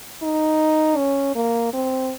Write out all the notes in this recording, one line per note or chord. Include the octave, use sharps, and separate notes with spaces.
D#4
C#4
A#3
C4